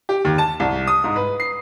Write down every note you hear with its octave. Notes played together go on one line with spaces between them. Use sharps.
G4
D#2
A5
C2
D#6
G#2
B4
C7